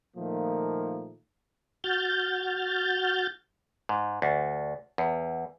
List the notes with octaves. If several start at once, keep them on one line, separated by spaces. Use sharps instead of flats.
A#2 D#3 F3 A3 A#3
F#4 F6 G6 A6
G#2
D2
E2